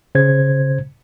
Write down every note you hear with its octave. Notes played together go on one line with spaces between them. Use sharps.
C#3 C5 G#6